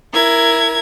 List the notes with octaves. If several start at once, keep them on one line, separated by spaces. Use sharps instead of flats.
E4 A#4 G#6